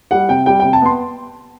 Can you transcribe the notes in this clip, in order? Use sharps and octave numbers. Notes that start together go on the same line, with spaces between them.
G3 F#5
C3 G5
G3 G5
C3 G5
A5
B3 C6